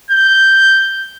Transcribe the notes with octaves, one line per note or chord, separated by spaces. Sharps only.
G6